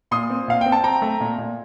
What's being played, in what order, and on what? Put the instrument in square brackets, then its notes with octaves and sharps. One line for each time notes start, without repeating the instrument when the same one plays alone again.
[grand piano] A#2 C6 D#6
C4
A#2 F5
C4 G5
A5
C4 G5 A#5
A3
A#2
A#2